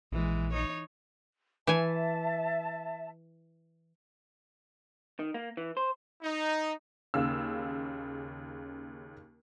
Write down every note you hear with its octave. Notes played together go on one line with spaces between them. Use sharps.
A#1 E3 G#3
D#4 C#5
E3 E5 G#5 A5
D#3
A#3
E3
C5
D#4
D#2 C#3 F5 E6